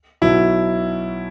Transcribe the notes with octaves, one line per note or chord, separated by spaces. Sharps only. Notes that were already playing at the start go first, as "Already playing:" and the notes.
B1 B2 F#3 E4